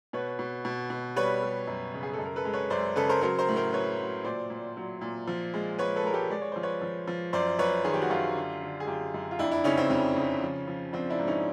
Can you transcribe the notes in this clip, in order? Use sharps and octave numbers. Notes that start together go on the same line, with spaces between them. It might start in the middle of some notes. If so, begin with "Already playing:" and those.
B2 B4 C#5
B2
B2
B2
G3 B4 C#5
G3
F#2
C#3
G#4
A4
F#2
A#4
A4 B4
G#3
B4 C#5
F#2 C5 D5
C#3 A4 B4
A#4 C5
F#3 A#4 C5
A#4 C5
A2
A#4 C5
F#3 B4 C#5
F#3
A#2 C5 D5
A#2
F#3
A#2
F3
G#3
G#3 B4 C#5
A4 B4
G#3 A#4
G4 A4
G#3 D5
C#5
F3 C5
B4 C#5
F3
F3
F#2 C5 D5
F#2 B4 C#5
D#3 G#4
G4
F#4
F#2 F4 G4
D3
D3
G#4
F#2 F4 G4
F#2
F4
F2 D4 E4
D4 E4
C#3 C#4 D#4
C4
F2 C#4
C#3
F3
F3
F3 C4 D4
D4 E4
G#2
C#4 D#4